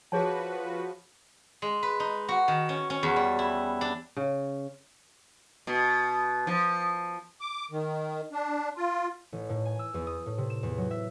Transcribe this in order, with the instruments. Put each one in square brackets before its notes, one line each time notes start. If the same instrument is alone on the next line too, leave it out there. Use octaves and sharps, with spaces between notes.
[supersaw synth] F3 F#4 B4 [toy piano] G#4 C#5 A5
[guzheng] G#3
B4
D#4
F#4
D#3
C#4
C#4
E2
G3
E4
D4
[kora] C#3
[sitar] B2
F3
[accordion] D6
D#3
D4
F4
[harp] A1
A2
G#5
E6
E2
D#6
A2
C3
E7
E2
F#3
E5